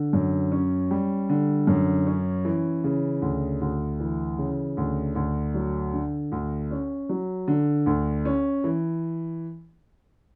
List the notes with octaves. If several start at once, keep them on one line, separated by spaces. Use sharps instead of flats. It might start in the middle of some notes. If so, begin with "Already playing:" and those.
Already playing: D3
F#2
C#4
G3
D3
F#2
C#4
E3
C#3
D2
D2
E3
C#3
D2
D2
F#3
D3
D2
C#4
F#3
D3
D2
C#4
E3